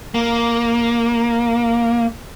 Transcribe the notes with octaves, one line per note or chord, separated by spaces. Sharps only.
A#3